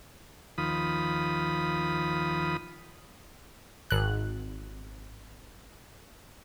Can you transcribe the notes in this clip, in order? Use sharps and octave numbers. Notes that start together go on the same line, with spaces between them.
D#2 F3 B5 D#6
G#1 F#6